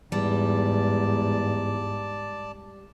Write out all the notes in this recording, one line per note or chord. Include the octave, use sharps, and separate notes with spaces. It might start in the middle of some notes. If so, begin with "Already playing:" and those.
E2 G#2 G3 D5 A5